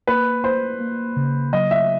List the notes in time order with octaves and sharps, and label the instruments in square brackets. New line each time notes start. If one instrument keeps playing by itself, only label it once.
[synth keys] A#3 [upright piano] B4
[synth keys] A#3 [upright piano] C5
[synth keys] A#3
C#3
[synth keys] F#3 [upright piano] D#5
[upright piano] E5